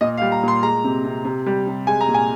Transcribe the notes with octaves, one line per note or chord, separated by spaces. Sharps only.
A#2 D#5
F5
G3
A#5
A#2 C6
G#3 A#5
C3
C3
C3
G3
C3
G#3 G#5
A#5
A#2
G#5